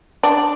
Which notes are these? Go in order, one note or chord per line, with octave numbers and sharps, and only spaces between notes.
D4